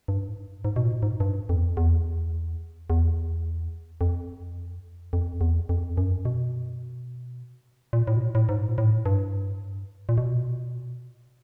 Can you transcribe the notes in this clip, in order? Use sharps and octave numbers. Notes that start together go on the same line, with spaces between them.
G2
G#2
G2
G#2
B2
A#2
G#2
G2
F2
E2
F2
E2
E2
F2
F2
E2
F2
F#2
B2
A#2
A2
B2
A#2
A2
G#2
A#2
A2
G2
A#2
B2